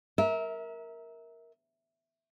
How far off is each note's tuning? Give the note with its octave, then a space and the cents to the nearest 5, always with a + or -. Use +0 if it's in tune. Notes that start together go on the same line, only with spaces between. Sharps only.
A#4 +0 E5 -25